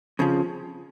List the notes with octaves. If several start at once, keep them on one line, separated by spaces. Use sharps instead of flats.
F2 C#3 F3